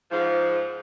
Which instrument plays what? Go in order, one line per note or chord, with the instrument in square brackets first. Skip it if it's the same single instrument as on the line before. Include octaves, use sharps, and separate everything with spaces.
[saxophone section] G#2 F3